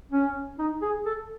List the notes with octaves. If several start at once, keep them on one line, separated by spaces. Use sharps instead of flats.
C#4
D#4
G#4
A4